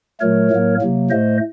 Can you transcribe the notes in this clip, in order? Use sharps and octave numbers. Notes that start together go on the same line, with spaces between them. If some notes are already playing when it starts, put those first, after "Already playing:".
A#2 F#3 A3 A#4 C#5
A2 F#3 A#3
C3 F#3 A#3
A2 A3 C5 D#5